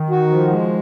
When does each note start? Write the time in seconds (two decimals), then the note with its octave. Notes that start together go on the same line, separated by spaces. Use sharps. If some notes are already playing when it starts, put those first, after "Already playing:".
Already playing: D#3
0.10 F#4
0.30 F3
0.50 G#3